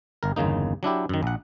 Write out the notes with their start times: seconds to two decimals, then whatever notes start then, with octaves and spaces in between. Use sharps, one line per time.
0.23 G1 A#4
0.36 G1 E2 C#3 A#3 D#4
0.83 F#3 D4 E4 G4
1.09 F#2 D#3
1.23 A#1 F#5